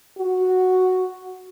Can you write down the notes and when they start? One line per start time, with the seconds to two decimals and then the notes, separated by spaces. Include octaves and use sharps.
0.18 F#4